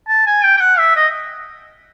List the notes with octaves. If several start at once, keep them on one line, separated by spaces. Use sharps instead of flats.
A5
G#5
G5
G5
F#5
E5
D#5